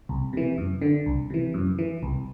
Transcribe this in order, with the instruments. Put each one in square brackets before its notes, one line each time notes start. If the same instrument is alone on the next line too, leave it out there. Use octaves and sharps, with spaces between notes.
[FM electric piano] C2
C3 E3
F#2
D3
C2
C3 E3
F#2
E3
C2